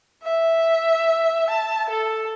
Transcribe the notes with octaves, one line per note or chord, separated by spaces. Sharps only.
E5
A5
A4